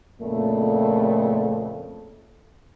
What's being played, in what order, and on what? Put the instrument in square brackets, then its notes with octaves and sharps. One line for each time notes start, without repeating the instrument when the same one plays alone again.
[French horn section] F2 A#2 C#3 A3